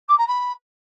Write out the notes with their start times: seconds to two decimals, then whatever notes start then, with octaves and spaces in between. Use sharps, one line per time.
0.09 D6
0.18 A#5
0.27 B5